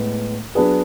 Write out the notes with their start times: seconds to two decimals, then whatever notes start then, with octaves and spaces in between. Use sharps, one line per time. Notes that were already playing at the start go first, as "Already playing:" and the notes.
Already playing: A2 G#3 B3
0.55 F#3 B3 D4 G#4 B4